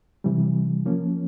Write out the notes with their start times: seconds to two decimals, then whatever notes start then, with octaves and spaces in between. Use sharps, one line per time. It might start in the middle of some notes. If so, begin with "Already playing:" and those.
0.24 C3 E3 G3
0.86 F3 A#3 C#4